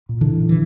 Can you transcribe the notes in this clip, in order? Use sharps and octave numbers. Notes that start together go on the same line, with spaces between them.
A#2
D3 E3
A#2
E3